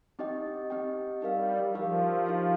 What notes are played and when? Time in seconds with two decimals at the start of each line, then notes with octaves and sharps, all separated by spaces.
0.19 C4 D#4 G4 D#5 G5
0.70 C4 D#4 G4 D#5 G5
1.22 G3 D#4 G4 A#4 F5
1.74 F3 D#4 G4 A#4 F5
2.26 D#4 G4 A#4 F5